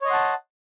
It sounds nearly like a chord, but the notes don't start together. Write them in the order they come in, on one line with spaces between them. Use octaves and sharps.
C#5 D#5 C6 F#5 A5